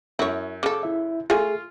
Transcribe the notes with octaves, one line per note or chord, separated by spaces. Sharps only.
F#2 E4 C#5
C#3 A4 D6
E4 E5
A3 F4 G#4 G#5